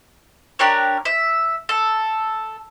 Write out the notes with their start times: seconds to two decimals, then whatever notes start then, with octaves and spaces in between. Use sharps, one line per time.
0.59 D4 G4 A#4 C#5
1.05 E5
1.69 A4